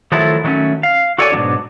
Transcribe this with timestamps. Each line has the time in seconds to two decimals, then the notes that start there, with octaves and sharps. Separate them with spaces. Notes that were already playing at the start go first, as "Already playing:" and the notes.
0.12 D#3 F3 F#3 A3 E4 A4
0.44 D#3 F#3 A3 C4 C#4
0.83 F5
1.18 F#4 A4 C#5 D5 G5 G#5
1.32 G#2 B2 D#3 F#3 D4